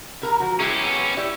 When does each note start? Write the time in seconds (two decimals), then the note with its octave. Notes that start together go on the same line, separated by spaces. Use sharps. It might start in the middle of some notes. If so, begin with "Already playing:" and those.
0.22 C3 A#4 A#5
0.40 F3 F#4
0.60 G#3 C#4 E4 G4 G#4
0.84 B3
1.17 E4 G4 D5